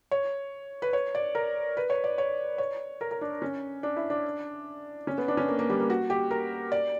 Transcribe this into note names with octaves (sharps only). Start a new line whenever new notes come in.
C#5
B4
C#5
D5
A#4
B4
C#5
D5
C#5
C#5
A#4
A#4
D4
C#4
D4
E4
D4
C#4
B3
D4
C#4
A#3
A#3
G3
A#3
F#4
G4
A#4
D5